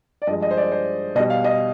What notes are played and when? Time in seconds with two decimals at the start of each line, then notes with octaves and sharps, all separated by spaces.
0.22 D5
0.27 G2 F3 G#3 D#5
0.42 D#5
0.51 C5
0.57 D5
0.72 C5
1.15 B2 D#5
1.20 G3
1.30 F5
1.44 D#5